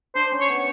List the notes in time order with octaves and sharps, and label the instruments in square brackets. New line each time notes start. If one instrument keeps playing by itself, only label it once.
[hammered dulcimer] D4 [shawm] C5
[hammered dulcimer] C#4
[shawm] C#5
[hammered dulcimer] B3